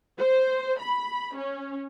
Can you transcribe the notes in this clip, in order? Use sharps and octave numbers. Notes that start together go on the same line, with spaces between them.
C5
B5
C#4